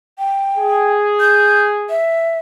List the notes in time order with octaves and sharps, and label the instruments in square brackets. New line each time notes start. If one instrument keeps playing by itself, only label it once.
[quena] G5
[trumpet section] G#4
[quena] G6
E5